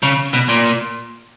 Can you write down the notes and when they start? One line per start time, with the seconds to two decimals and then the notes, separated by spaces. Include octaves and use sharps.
0.03 C#3
0.33 B2
0.48 A#2